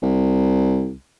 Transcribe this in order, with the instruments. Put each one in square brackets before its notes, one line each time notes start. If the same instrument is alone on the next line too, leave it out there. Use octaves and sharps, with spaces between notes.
[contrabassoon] C2